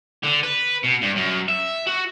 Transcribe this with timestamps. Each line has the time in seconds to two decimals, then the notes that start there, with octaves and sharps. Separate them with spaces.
0.23 D3
0.43 B4
0.84 B2
1.03 G2
1.16 F#2
1.48 E5
1.87 F#4